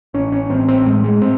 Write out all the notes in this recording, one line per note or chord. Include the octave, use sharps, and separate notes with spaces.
A1 C#4
C#4
A1 C4
C4
A2 G#3
G#3
A2 C4